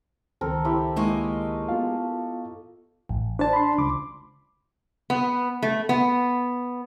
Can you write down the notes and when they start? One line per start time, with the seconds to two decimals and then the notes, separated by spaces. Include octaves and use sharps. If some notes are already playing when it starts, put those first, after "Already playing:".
0.41 C#2 D#3 C4 A4 A#4
0.65 C4 E4 G4
0.96 G#3 A#3 D#4 D#5 C#6 E6
1.69 B3 F4 A4 F5
3.09 A1
3.39 D4 C5 D5 A5
3.53 B5 C6
3.78 C#2 D6
5.10 B3
5.63 A3
5.89 B3